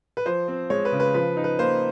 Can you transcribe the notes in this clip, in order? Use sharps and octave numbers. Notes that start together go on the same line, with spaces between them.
B4
F3 C5
C4
G#3 C#5
B4
C#3
B4
F3 B4
D#4
B4
A#3 C5